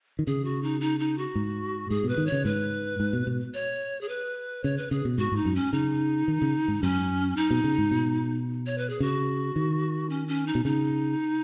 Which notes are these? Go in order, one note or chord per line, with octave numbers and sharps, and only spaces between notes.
D#3
C#3 G#4
F#4
D#4
D#4
D#4
F#4
G#2
G#2 G#4
B2
B4
D#3
C#5
C#3
G#2 B4
G#2
B2
B2
C#5
G#4
B4
C#3 C#5
B4
C#3 G#4
B2
G#2 F#4
G#2 D#4
F#2
C#4
C#3 D#4
D#3
C#3
G#2
F#2 C#4
D#4
B2
C#3
G#2
B2
C#5
B4
G#4
C#3 F#4
D#3
C#4
C#4
D#4
B2
C#3 D#4